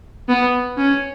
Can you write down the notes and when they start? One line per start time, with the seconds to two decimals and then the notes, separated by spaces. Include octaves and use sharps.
0.29 B3
0.78 C#4